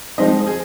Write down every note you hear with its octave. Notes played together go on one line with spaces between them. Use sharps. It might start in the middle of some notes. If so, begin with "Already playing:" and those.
F3 G#3 C4 D#4 D#5
G#4